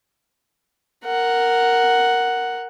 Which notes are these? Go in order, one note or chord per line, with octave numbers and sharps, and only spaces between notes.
A#4 F#5